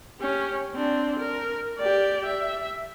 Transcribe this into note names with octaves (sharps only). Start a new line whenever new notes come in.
C#4 G4
C4 D4
A#4
G4 D5
E5